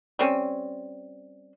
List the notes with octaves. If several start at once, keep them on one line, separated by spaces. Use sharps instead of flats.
G3 C4 C#4